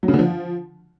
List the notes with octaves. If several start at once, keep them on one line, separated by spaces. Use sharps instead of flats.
F#3
C#3
D3
F3